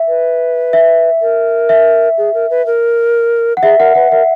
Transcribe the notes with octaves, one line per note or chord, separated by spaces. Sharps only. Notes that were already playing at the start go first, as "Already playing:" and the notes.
Already playing: E5
B4
E5
A#4
E5
G#4
A#4
B4
A#4
F#5
G#4 E5
A#4 F#5
B4 F#5
A#4 E5